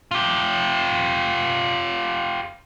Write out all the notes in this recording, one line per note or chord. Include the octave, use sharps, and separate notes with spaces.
F4 G4